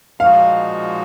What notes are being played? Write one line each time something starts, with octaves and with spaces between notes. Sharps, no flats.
A#2 F3 G#3 D#4 F#4 F5